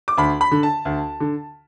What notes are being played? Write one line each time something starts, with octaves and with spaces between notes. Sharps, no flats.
D6
D2 B5
B5
D3
A5
D2
D3